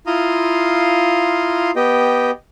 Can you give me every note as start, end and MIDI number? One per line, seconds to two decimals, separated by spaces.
0.07 1.71 64
0.07 1.71 65
0.07 1.71 77
0.07 1.71 82
0.07 1.71 84
0.07 1.71 87
1.76 2.31 59
1.76 2.31 67
1.76 2.31 75
1.76 2.31 79